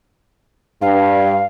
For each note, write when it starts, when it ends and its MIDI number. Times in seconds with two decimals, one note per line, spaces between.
0.82 1.40 43
0.82 1.46 77